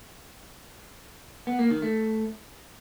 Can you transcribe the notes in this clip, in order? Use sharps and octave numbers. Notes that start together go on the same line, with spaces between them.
B3
A#3
D#3
A3